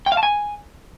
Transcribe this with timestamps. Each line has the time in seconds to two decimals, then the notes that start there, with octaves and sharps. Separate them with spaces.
0.06 G5
0.12 F5
0.17 A5
0.23 G#5